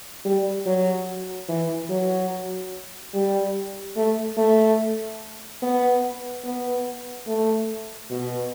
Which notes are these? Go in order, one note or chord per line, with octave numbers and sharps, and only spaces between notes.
G3
F#3
E3
F#3
G3
A3
A3
B3
B3
A3
B2